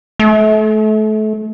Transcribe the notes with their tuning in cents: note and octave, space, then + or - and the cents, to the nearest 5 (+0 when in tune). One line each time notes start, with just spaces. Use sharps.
A3 -30